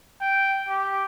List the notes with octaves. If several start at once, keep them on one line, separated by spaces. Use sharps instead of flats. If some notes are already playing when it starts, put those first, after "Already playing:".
G5
G4